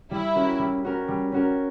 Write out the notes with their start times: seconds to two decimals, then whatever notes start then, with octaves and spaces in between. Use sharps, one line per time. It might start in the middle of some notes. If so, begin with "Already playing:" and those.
0.11 G3 E4
0.35 C#4 F#4 A#4
0.59 G3
0.84 C#4 F#4 A#4
1.08 G3
1.32 C#4 F#4 A#4